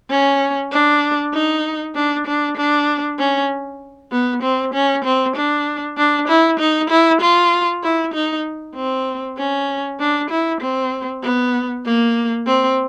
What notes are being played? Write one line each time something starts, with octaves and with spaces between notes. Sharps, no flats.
C#4
D4
D#4
D4
D4
D4
C#4
B3
C4
C#4
C4
D4
D4
E4
D#4
E4
F4
E4
D#4
C4
C#4
D4
E4
C4
B3
A#3
C4